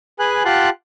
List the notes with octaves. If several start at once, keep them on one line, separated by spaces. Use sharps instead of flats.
G#4 B4 G#5 F#6
F4 G4 F#5 A5 C6 F#6